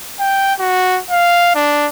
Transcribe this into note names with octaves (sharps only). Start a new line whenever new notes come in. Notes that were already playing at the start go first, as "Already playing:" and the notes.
G5
F#4
F5
D4